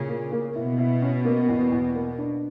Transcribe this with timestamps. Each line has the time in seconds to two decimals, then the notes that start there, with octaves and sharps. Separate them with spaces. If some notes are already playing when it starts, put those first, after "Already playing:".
Already playing: A#2 C#3
0.09 A#3
0.32 A#3
0.55 B2 E4
0.78 E4
1.02 C#4
1.25 A#3
1.49 E2
1.72 E2
1.95 A#3
2.18 D4